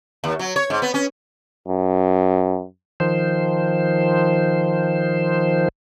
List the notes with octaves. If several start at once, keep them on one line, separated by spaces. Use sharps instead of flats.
D#2
F#3
C#5
G#2
B3
C#4
F#2
D#3 F3 C5